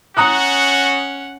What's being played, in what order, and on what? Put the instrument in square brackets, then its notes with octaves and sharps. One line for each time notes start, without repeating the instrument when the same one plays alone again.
[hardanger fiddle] C#4 F#5 [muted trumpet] F#4 [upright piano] A#5 D#6 F#6